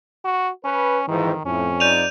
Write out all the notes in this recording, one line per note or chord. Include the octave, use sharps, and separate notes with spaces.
F#4
C#4 B4
F2 G#2 D#3 E3
F2 A2 C#4
D#4 F4 D5 G6 D#7 F7